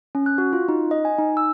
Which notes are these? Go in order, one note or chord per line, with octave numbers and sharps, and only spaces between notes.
C#4
F#6
F#4
F4
D#4
D#5
G#5
D#4
E6